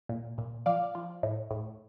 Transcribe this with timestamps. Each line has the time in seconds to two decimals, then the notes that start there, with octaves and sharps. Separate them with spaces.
0.09 A#2
0.38 A#2
0.66 F3 D5 F5
0.95 F3
1.23 A2
1.51 A2